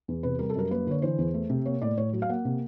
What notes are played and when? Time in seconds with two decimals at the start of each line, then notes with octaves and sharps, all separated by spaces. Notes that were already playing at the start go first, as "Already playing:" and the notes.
0.08 E2
0.23 C3 B4
0.39 G3 A#4
0.50 A4
0.55 F#2 A#4
0.71 A#3 B4
0.87 D3 C#5
1.02 E3 C5
1.18 E2
1.34 A3
1.50 C3
1.66 A#3 C#5
1.82 A2 D5
1.97 A2 C#5
2.13 F#3
2.22 F5
2.29 A#3 F#5
2.45 C3